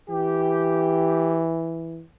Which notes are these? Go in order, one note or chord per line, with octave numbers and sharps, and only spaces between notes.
E3 G4